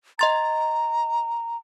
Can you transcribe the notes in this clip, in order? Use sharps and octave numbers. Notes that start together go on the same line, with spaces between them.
D#5 A#5 C6 A6